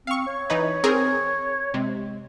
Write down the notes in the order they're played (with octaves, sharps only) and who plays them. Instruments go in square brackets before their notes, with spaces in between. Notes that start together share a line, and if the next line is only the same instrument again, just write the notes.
[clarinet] C4 [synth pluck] F5 C#6
[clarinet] C#5
[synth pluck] E3 D#4 B4
C4 G#4 A#4
[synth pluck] C3 [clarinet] G#3